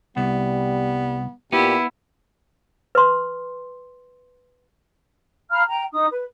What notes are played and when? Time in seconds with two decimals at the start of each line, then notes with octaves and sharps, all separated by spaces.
0.17 C2 G3 B3
1.52 A#2 B3 E4 G4
2.95 B4 C6
5.51 F5 A#5 B5 F6
5.67 G5 A#5
5.92 D#4 D#6
6.10 B4